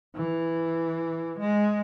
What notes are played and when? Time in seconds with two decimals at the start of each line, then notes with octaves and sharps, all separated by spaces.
0.15 E3
1.40 G#3